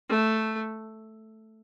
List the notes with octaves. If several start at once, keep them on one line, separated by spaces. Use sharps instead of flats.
A3